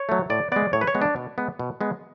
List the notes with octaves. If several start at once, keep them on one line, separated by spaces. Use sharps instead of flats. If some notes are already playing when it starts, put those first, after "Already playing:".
Already playing: C#5
F#3 A3
A2 D5
G#3 B3 D5
A2 C#5
B4
C#5
G#3 B3
D4
B2
G#3 B3
B2
G#3 B3